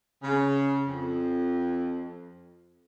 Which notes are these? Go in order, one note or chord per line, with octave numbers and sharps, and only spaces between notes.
C#3
F2